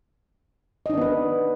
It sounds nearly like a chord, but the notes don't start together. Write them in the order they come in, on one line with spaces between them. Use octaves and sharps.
D#5 D#4 D4 B3 B4